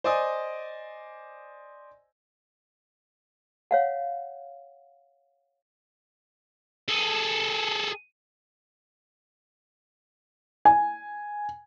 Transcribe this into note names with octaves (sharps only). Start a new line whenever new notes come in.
C5 D5 D#5 G#5 D#6
C#5 F5 F#5
G#4 A4
G#5